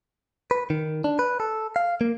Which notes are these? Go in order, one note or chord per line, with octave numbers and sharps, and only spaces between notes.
B4
D#3
D4
B4
A4
F5
A#3